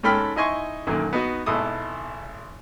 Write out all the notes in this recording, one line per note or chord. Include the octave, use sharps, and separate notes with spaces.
G#2 C#4 A4 G5 B5 F6
D#4 E4 D#5 G#5 C6 C#6
F#2 A#2 D3 D#3
B3 D#4 F#4
G#1 B2 E4 A4 D#6